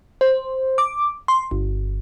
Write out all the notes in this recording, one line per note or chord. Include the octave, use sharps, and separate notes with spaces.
C5
D6
C6
G1